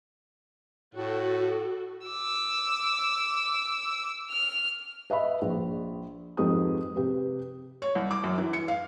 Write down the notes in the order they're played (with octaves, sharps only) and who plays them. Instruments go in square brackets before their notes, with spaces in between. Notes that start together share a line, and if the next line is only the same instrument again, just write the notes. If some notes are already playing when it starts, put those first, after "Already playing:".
[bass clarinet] A2 [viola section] F#4 A4
[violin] D6 E6
F6
[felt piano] B4 D#5 E5 B5
A#1
F2 G#2 G4 B4 D#6
C3 G4 B4
C#5
C2
D6
F#2
E3
C#7
F5